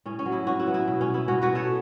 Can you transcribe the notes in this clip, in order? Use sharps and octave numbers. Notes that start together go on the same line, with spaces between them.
A2 C#4
C#4
F#3 B3
E4
A2 C#4 F#4
E4
F#3 B3
E4
B2
C#4
B3
E4
B2 C#4 F#4
F#4 B4
B3
A4 C#5